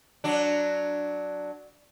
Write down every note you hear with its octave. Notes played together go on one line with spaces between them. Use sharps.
F#3 D4